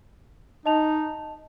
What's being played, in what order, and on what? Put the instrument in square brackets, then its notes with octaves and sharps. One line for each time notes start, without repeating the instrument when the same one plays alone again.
[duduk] D#4 [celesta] D#5 A5 F7